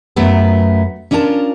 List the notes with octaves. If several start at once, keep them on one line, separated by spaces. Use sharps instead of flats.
F#2 F#3 A3 B3
C#4 D4 F4 A#4 A5